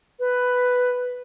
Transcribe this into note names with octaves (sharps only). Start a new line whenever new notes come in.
B4